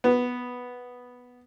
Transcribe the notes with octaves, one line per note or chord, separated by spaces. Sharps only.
B3